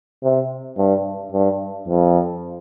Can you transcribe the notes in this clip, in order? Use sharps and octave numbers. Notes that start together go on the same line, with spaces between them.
C3
G2
G2
F2